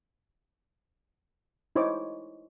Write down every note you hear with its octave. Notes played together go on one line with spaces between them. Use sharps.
D#4 E4 C5 C#5 D6